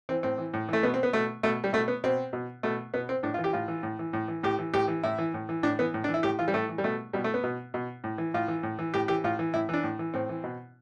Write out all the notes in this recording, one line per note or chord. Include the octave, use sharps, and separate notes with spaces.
E3 C4
A2 C4
E3
A2
E3 A3
B2 B3
C4
B3
B2 A3
B2 A3
G3
B2 A3
B3
B2 C4
B2
B2 A3
B2 B3
C4
A2 D4
F4
E3
G4
A2 F4
E3
A2
E3
A2
E3
A2 G4
E3
A2 G4
E3
A2 E4
E3
A2
E3
A2 D4
E3 B3
A2
D4
E3
E4
A2 G4
E3 F4
G3
A2 A3
E3
G3
B2 A3
B2 G3
A3
B3
B2
B2
A2
E3
A2 F4
E3
A2
E3
A2 G4
E3 G4
A2 F4
E3
A2 E4
E3 D4
A2
E3
A2 C4
E3
B2